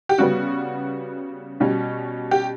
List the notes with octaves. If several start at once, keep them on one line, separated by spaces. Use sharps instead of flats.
G4
C#3 G3 B3 F#4
B2 G3 C#4
G4